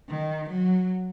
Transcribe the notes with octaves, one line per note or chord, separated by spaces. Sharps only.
D#3
F#3